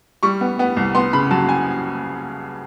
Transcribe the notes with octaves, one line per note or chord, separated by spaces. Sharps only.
G3 C#6
B3
B3
C2
B3 C6
C#3 B5
F#3 A5
G#5